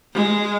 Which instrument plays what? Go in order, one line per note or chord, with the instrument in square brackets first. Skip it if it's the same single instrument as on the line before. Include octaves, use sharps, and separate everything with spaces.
[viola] G#3